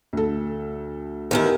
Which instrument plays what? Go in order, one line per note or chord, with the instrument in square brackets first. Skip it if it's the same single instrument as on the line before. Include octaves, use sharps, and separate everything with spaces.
[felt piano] D2 A4
[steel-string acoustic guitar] E2 D#3 E4 [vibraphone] G4 A#4 G#5